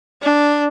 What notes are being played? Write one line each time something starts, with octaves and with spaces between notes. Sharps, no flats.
D4